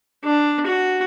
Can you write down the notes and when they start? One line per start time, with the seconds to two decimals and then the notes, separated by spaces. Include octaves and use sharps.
0.24 D4
0.66 F#4